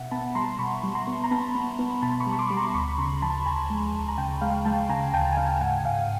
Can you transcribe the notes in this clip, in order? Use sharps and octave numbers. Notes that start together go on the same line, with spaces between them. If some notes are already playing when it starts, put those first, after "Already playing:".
Already playing: B2 E5 F#5
B3 A5 B5
G3 A#5 C6
B2 B5 C#6
G3
A#5 C6
B3
A#5
B3 A5 B5
B3
B3
B2 A5 B5
B5 C#6
G3
C#6
C6 D6
G3 C#6
A#5 C6
D2 B5 C#6
C#3 A#5 C6
F3 A5 B5
D2 G#5 A#5
G#3
D2
A#5
C#3 G5 A5
G#3 F5 G5
G#3 G5 A5
C#3 G#5 A#5
D2 G5 A5
G#5
C#3 F5 G5
G#2 F#5 G#5
G#2 F5 G5